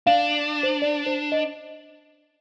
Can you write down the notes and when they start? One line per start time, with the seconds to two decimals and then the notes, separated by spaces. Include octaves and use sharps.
0.07 D4 F5
0.63 C5
0.82 D5
1.06 C5
1.32 D#5